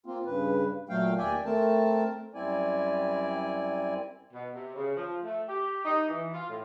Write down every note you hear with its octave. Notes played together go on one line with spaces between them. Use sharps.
A#3 C4 F4
G2 C#3 B4
A#2 F#3 A3 F5 G5
D#2 D5 E5 G5 G#5
A3 C4 A#4 A5
F#2 G3 C4 E4 D5 G#5
B2
C3
C#3
F3
A3
G4
D#4
E3
F4
A2